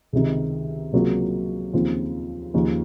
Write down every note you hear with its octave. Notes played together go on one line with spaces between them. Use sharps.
C#2 C3 D#3
C#2 C3 F#3 A#3 F4
D#2 C#3 F3 C4 F4
D#2 C#3 F3